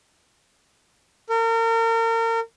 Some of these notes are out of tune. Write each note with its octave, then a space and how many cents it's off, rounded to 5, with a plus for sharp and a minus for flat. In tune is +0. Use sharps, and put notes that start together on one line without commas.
A#4 -35